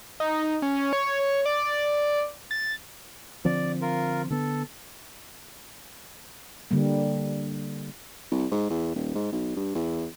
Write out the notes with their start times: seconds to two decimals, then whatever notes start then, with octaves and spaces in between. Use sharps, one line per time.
0.20 D#4
0.62 C#4
0.93 C#5
1.46 D5
2.51 A6
3.45 D3 F3 C4 D5
3.81 F4 A#4
4.30 D3 B3 A4
6.71 D3 G3 A#3
8.31 C2
8.51 G#2
8.70 E2
8.95 D#1
9.15 G#2
9.32 B1
9.56 G2
9.75 E2